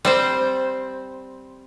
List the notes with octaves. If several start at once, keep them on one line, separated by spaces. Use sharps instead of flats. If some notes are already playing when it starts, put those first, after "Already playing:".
G3 C4 C5